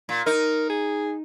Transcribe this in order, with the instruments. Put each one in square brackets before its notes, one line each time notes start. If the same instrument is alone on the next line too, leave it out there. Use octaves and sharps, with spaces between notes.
[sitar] A#2
[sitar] D#4 [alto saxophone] A#4
[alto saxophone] G#4